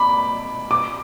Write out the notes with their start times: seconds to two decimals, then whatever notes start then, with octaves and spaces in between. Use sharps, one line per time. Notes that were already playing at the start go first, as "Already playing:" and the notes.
Already playing: B5 D6
0.71 D6